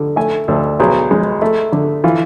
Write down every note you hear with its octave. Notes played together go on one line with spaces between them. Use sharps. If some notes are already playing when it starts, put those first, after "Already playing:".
Already playing: D3
A3 G#5
D2 A4
B1 G#4
G#3
A3
D3
E3 F4